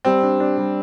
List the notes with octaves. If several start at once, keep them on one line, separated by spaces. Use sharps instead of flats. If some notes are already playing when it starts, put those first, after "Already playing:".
G3 C4
D4
D4
G3